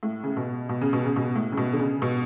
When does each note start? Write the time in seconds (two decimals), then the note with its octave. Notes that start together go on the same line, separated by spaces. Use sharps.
0.03 A2
0.23 C#3
0.37 B2
0.69 B2
0.81 C#3
0.93 B2
1.05 C#3
1.16 B2
1.35 A2
1.52 C#3
1.57 B2
1.73 D3
1.79 C#3
2.02 B2